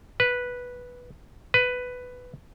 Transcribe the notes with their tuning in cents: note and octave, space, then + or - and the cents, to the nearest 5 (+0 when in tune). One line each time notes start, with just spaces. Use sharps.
B4 -5
B4 +10